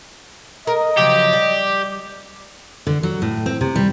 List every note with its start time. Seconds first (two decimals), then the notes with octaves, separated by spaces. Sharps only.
0.67 A#4 D#5
0.97 C#3 F3 F#3 G4
1.33 G3
2.87 D3
3.03 F#3
3.22 A2
3.46 C4
3.61 C3
3.76 G3